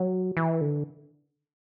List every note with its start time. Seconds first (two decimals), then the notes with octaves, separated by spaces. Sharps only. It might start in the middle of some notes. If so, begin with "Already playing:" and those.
Already playing: F#3
0.37 E3
0.61 D3